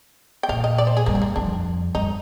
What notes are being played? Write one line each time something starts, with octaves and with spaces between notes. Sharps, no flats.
G5
A#2 F5
D#5
D5
C5
G#4
G2 A#3
C4
A#3
F2 D4
G2 D#4